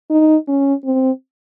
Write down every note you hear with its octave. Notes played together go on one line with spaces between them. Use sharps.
D#4
C#4
C4